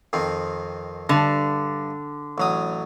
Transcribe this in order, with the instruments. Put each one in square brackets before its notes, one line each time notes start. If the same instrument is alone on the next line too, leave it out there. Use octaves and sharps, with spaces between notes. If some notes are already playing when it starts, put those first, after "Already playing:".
[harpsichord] F2 D#3 C4
[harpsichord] G2 [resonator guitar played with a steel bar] D3
[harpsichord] A1 F#3 D#6